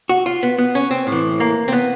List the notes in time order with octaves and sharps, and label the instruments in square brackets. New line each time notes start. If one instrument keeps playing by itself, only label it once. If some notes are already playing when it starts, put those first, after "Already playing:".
[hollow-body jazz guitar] F#4
F4
B3
B3
C#4
C4
A2
E3
A#3
C4
B3